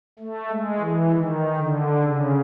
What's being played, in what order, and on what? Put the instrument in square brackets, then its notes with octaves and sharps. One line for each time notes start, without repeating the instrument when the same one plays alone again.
[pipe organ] A3
G#3
E3
D#3
D3
C#3